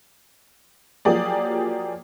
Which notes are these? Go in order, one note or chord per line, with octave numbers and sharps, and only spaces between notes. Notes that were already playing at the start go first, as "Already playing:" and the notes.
F3 F#3 A#3 G4 G#4 D5